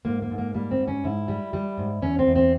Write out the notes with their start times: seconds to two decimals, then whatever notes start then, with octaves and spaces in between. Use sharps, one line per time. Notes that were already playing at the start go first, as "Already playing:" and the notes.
0.05 G#2 A#3
0.22 A#3
0.30 G#2
0.38 A#3
0.54 G3 A#3
0.71 C4
0.79 G#2
0.88 C#4
1.04 G#2 E4
1.28 G3
1.53 G3
1.77 G#2
2.02 E2 C#4
2.19 C4
2.27 E2
2.36 C4